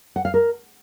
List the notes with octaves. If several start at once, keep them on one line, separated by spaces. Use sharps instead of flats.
F#5
F5
A#4